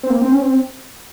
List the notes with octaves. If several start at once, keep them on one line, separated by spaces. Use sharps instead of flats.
C4
A#3
C4
C#4
C4